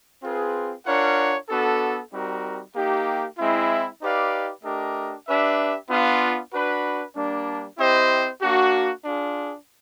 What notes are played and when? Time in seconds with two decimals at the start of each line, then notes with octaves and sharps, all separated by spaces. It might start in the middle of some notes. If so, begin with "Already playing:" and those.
0.23 C4 F4 G#4 B4
0.86 D4 F4 A#4 C#5 F#5
1.49 B3 D4 F#4 A4
2.12 G3 C4 D#4 F#4 A#4
2.74 A#3 D#4 G4
3.37 G#3 C4 E4
4.01 D#4 G4 B4 D5 F5
4.64 A3 D4 G4 A#4 D#5
5.27 D4 G4 B4 E5
5.89 B3 D4 F4
6.52 D4 F#4 B4
7.15 G3 A#3 D4
7.78 C4 E4 G4 C5 D#5
8.41 A#3 D4 F#4
9.05 D4 F4 G#4